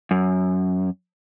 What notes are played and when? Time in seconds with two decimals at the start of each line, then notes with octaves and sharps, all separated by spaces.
0.11 F#2